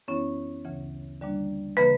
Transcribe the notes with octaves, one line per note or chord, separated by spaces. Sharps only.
F#2 E3 B3 C#4 E4 C#5
D2 C#3 E3
D3 G3 A#3 D4
C#3 E3 A#3 B4 B5